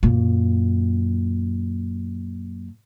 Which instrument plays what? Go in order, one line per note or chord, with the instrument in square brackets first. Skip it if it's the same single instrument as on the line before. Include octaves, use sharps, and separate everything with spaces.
[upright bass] F#2 A#2